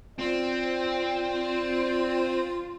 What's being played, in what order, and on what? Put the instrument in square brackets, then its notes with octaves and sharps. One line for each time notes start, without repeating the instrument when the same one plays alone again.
[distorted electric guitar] C4 [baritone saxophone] F4 [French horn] D5